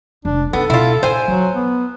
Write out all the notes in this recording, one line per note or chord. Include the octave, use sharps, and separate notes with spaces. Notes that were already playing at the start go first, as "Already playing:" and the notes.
F1 G#3 D4
F2 B3 D#4 A4
B2 E4 F4
A#2 C5 G#5
F3 F#3
B3